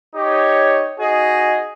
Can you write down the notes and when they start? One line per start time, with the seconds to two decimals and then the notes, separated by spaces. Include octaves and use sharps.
0.15 D#4 G4 C#5
0.98 D#4 F#4 G#4 D#5